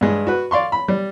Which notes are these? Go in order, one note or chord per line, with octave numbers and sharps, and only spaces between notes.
G2 G#3
F#4 B4
D5 F5 C6 C#6
B5
G3